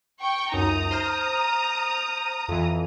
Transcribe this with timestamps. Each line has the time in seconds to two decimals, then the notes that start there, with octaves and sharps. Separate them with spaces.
0.21 G5 C#6
0.52 C#2 F#2 D#4 A#5 D#6
0.91 C5 F6 G6
2.48 F2 E3